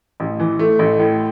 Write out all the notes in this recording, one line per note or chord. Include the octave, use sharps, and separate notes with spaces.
A1
E3
A3
A1
A2